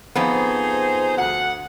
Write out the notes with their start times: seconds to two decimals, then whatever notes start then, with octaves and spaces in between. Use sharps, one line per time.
0.15 F2 B3 D#4 G#4 C5
1.18 D2 F#5